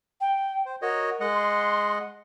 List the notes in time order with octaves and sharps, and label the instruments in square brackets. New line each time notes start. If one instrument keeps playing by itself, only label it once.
[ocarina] G5
[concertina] C5
[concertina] F#4 C#5 D#5 [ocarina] A#4
[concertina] G#3 D#5 F#5
[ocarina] C6